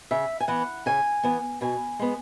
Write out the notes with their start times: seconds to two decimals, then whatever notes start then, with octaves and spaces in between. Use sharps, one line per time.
0.11 C#3 E5
0.40 G#5
0.48 E3 B3 F#5
0.86 C#3 G#5
1.24 E3 B3
1.61 B2 G#5
1.99 G#3 B3